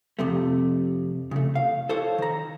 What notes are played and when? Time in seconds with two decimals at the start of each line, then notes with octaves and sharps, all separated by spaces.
0.19 F2 C3 A3
1.31 C#3 A3
1.55 F5
1.89 A4 C5 C#5
2.18 D#3 A#5